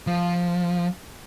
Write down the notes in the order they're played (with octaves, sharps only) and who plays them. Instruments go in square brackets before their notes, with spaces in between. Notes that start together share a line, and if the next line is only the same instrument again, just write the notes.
[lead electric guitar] F3